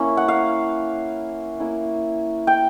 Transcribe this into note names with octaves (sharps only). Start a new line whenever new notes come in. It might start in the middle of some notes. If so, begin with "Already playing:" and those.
Already playing: A#3 C#4 E4
F#5
F5
A#3 C#4 E4
G5